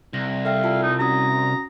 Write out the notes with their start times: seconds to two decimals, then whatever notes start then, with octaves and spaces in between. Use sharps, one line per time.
0.14 C2 A#6
0.45 A4 E5 F5 G5
0.64 F4 A5 E6
0.83 D#4
0.99 C#4 F#4 A#5 D#6